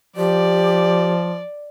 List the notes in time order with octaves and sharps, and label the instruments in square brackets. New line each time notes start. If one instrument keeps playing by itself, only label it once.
[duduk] F3 [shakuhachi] G4 [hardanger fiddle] D5